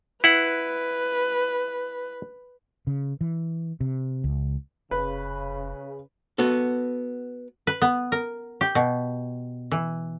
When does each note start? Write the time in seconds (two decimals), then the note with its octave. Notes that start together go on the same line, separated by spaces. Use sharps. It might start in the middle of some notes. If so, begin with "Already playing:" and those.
0.24 E4 B4 F#5
2.87 C#3
3.21 E3
3.80 C3
4.24 C#2
4.91 F1 C#3 B4
6.38 B3 F#4 A4
7.67 B4
7.82 B3
8.12 A#4
8.61 G4
8.75 B2
9.72 E3